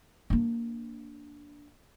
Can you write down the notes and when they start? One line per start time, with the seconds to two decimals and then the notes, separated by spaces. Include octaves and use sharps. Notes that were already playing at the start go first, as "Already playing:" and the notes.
0.30 A#3 D4